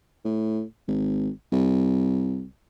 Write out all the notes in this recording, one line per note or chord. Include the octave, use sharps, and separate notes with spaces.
A2
G#1
C2